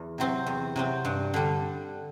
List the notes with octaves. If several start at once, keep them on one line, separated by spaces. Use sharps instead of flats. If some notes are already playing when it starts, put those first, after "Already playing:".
Already playing: E2
C3 F#3 C4
E2
C3 F#3 C4
G2
D3 G3